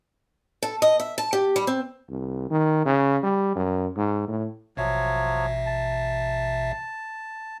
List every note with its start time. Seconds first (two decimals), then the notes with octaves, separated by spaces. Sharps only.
0.63 A4
0.82 D#5
1.00 E5
1.18 A5
1.33 G4
1.56 G3
1.67 C4
2.10 C2
2.50 D#3
2.85 C#3
3.23 G3
3.56 F#2
3.96 G#2
4.28 A2
4.77 A1 B2 F3 F#3 C#5 E5
5.66 A5